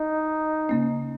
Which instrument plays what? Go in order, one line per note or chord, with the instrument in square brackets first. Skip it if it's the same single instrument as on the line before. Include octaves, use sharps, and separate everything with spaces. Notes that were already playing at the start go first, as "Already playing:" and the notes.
Already playing: [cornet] D#4
[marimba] C#3 A#3 C#4